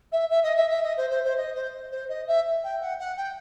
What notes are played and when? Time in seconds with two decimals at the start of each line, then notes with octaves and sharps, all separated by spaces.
0.12 E5
0.30 E5
0.43 D#5
0.56 E5
0.70 E5
0.83 D#5
0.97 C5
1.09 C5
1.24 C5
1.37 D#5
1.55 C5
1.91 C5
2.09 D#5
2.27 E5
2.63 G5
2.81 F#5
2.99 F#5
3.16 G5